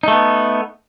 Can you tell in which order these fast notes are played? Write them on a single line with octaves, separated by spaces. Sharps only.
D#4 A3 B3